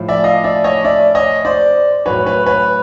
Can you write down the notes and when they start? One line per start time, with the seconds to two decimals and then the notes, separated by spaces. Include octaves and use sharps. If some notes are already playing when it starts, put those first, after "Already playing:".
Already playing: A2 F3
0.08 D5 E5
0.24 D#5 F5
0.44 D5 E5
0.64 C#5 D#5
0.84 D5 E5
1.15 C#5 D#5
1.45 C5 D5
2.06 A2 F#3 B4 C#5
2.26 B4 C#5
2.46 B4 C#5